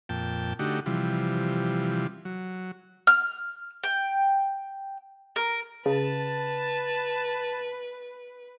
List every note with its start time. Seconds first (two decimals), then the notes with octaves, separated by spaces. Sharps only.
0.09 F2 A#2 G5 A5
0.59 D3 A3 D#4 F#4 G4
0.86 C3 E3 F3 G3
2.25 F#3
3.07 F6
3.84 G5
5.36 A#4
5.86 C#3 B4 A5